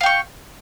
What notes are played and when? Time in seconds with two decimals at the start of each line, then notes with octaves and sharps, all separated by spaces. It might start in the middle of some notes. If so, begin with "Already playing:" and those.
0.01 F5
0.03 G5
0.06 C#6